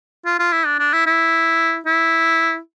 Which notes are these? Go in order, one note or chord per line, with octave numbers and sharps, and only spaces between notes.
F4
F4
E4
D4
D4
E4
E4
E4